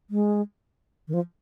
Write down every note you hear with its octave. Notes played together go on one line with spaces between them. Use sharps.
G#3
D#3
F3